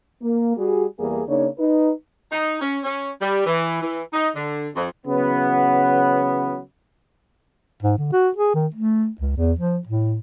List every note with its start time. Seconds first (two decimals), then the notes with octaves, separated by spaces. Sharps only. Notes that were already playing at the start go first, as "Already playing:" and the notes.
0.22 A#3
0.57 G3 F#4 G#4
0.99 E2 G3 A#3 G#4
1.28 C#3 A#3 D4 D#4 C#5
1.59 D#4 B4
2.31 D#4
2.61 C#4
2.84 C#4
3.20 G3
3.45 E3
3.82 E3
4.13 D#4
4.34 D3
4.75 F2
5.06 C#3 E3 F#3 B3
7.82 G#2
7.98 D3
8.12 F#4
8.36 G#4
8.55 D#3
8.75 A3
9.21 C#2
9.37 E2
9.59 F3
9.87 A2